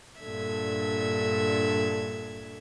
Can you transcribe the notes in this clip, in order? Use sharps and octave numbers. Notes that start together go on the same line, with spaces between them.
G2 A#2 D3 E5 G#6